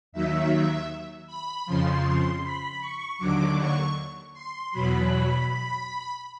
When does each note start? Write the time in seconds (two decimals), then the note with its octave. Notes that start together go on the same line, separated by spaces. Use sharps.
0.12 D#2 D#3 F#3 E5
1.27 B5
1.66 F2 C#3 F3 C6
2.43 B5
2.81 C#6
3.19 D#2 D3 F#3 D6
3.57 C#6
4.34 C6
4.72 E2 B2 F#3 B5